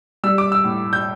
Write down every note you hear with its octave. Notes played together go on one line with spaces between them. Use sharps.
G3 E6
D6
E6
A2
G6